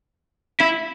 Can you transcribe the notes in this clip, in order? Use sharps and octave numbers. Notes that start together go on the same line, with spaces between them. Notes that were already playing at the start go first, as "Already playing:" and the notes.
E4